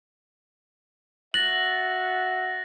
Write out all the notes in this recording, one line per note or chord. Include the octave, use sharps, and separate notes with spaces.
F#4 E5 F#6 A6 A#6 F#7